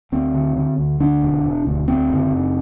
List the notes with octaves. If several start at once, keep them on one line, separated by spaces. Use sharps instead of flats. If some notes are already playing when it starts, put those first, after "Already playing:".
D2 C4
D3
D3
D2
D3 D4
E1
E1
D2
D3 C4
F#1
F#1